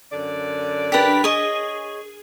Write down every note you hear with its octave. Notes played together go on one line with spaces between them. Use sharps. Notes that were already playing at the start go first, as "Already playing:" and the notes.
F#2 D3 D5
D4 G4 A#4 B4 B6
G#4 C#5 D#5